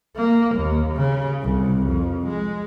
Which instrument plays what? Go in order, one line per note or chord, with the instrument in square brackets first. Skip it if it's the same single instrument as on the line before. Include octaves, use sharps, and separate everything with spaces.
[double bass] A#3
D#2
C#3
C2
F2
G#3